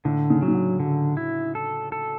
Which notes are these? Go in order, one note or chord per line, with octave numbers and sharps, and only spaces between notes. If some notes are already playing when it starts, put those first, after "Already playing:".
A2 D3
C#3
F#3
C#3
D3
D3 F#3
E4
A4
A4